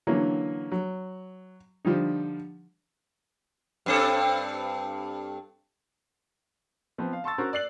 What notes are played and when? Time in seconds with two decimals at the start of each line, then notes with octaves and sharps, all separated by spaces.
0.07 D3 E3 F#3 A#3 C#4
0.72 F#3
1.85 D3 F3 G3 D#4
3.86 G2 C4 A4
6.98 F3 B3 C4
7.13 F5
7.24 A5 C6 C#6 E6 A6
7.38 C#4 F#4 A#4 C5
7.53 D5 F#6 C7 F#7